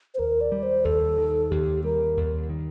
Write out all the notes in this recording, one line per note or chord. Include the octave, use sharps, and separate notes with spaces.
C5
D#2 A#4
D5
G3
C5
D#2 A4
D#3
D#2 G4
G3 A#4
D#2
D#3